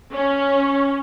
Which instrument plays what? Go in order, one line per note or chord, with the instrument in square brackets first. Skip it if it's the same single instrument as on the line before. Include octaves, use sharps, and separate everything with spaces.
[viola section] C#4